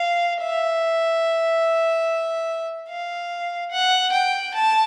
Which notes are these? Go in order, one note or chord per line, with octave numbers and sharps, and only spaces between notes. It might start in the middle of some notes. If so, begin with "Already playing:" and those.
Already playing: F5
E5
F5
F#5
G5
A5